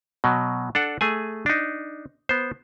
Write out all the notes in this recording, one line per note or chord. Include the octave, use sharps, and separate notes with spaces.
B2 F#3
D4 A4 F#5
A3 G#4 G#5
D4 D#4
B3 C5